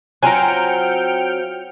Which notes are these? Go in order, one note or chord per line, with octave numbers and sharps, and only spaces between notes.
F#3 C4 F4 G5 G#5 A#5 F6 C#7